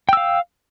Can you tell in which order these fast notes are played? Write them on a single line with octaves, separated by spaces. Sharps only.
G5 E6 F5